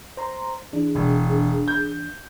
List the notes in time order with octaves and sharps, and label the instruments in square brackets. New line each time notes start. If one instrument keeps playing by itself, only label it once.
[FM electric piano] C5 A#5 C6
[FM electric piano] E3 D4 [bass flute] G#4
[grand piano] E1
G6